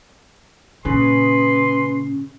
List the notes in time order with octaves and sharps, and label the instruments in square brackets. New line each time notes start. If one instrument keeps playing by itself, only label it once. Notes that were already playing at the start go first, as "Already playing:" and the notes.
[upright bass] A#2 [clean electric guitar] C#3 [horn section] G#4 B4 [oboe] C6